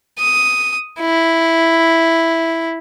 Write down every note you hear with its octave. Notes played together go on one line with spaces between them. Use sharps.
D#6
E4